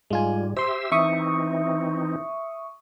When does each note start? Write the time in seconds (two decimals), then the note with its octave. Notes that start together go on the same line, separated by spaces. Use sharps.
0.10 G#2 G3 G#3 F4 G#5
0.57 G4 C5 E5 C6 E6
0.92 E3 C4 D#4 E5 C#6 D#6